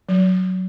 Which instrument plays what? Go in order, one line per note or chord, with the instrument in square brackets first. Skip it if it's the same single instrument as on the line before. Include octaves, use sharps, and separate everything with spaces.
[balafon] F#3